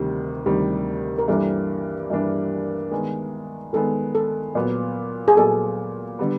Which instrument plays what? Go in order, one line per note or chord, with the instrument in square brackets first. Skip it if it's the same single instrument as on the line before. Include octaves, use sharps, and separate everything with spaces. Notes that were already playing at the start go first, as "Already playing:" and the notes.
Already playing: [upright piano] D2 C3 D#3 G3
D2 C3 D#3 G3
[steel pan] A#4
[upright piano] G2 E3 G3 A#3 D4 [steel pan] A4
[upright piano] G2 E3 G3 A#3 D4
D#3 G#3 B3
[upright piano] D#3 G#3 B3 [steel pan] A4
[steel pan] A4
[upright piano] A#2 F#3 B3
[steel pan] G#4
[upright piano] A#2 F#3 B3 [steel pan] A4
[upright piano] D3 G3 B3